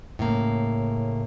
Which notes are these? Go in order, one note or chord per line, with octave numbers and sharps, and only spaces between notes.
A2 C#3 A#3